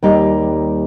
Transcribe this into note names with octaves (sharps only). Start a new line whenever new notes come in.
D#2 G3 D#4